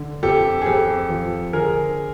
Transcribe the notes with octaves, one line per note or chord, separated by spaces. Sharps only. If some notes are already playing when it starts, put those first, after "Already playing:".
Already playing: D3
F2 G4 A4
G#4
F2 G4 A4
F3
D3 G#4 A#4